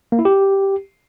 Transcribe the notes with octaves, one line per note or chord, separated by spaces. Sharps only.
A#3
E4
G4